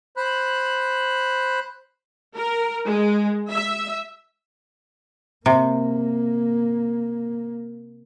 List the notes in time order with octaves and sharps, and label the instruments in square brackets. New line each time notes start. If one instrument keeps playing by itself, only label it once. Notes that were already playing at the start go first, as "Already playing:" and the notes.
[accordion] C5 B5 F#6
[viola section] A#4
G#3
E5
[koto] C3 [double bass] A#3